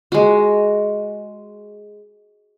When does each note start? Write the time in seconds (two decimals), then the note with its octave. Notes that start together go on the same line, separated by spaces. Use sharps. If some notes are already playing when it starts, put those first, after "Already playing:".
0.12 G#3 F#4